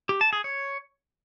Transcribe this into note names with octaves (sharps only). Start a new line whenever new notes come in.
G4
A5
G#4
C#5